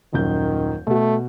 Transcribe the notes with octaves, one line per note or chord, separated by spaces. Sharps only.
D#1 F#2 D#3 G6
B2 A3 F#4